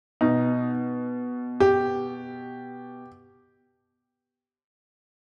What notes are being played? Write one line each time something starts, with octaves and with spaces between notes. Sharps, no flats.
B2 D#4
G4